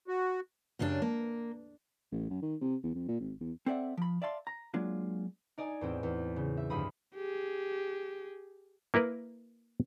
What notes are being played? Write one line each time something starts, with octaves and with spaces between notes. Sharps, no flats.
F#4
F#2 C#3 G3 D4
A#3
A1
F#2
D#3
C3
E2
F2
A#2
G#1
E2
C4 A4 D5 E5 F#5
F3 B5
D5 E5 F5 A5 C6
A#5
F#3 G#3 A#3 D4 F4
D#4 D5 D#5 G#5
E2 A2 C4
E2
C#3
E5
D2 G2 F3 B5 D#6
G4 G#4
A#3 E4 A#4 B4